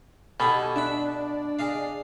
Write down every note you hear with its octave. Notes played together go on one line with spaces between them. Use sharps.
B2 D#4 G4 A4 G#5
D4 E5 F#5 B5
G#4 D#5 F5